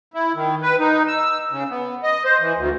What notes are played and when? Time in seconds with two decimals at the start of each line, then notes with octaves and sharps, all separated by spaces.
0.14 E4
0.35 D#3
0.63 B4
0.80 D#4
1.07 E6
1.51 C#3
1.70 B3
2.04 D#5
2.25 C5
2.40 E3
2.56 D2